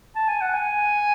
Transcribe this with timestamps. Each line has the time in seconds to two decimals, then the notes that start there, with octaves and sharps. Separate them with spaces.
0.15 A5
0.28 G#5
0.41 F#5
0.54 G#5